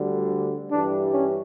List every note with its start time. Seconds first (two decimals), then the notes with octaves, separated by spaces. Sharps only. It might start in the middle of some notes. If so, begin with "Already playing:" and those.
Already playing: D2 D3 G3
0.71 G2 E3 G3 D4
1.13 C#4